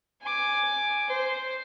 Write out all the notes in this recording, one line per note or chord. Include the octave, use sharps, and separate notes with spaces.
G#5 D6
C5